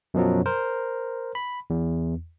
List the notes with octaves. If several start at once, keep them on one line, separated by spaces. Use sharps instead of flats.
F#2 B2 F3 F#3
A#4 C5
B5
E2